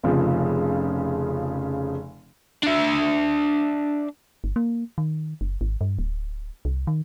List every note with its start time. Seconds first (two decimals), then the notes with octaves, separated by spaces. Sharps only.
0.03 F1 C#3 F3
2.63 D4 E5
4.44 G1
4.56 A#3
4.98 D#3
5.41 F#1
5.61 G#1
5.81 G2
5.99 D1
6.65 C2
6.87 D#3